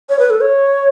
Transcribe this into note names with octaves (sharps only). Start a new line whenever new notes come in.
C#5
B4
A4
C#5